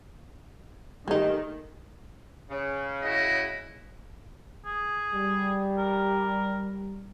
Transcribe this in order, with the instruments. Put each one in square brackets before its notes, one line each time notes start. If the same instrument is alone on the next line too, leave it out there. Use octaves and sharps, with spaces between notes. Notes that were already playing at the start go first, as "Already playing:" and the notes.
[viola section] D#3 [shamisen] G#3 D#4 [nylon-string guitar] A3 G4
[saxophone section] C#3
[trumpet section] E4 F#4 D#5
[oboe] G#4
[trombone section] G3
[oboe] A#4